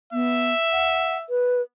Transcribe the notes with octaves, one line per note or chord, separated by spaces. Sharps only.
B3 E5
F#5
B4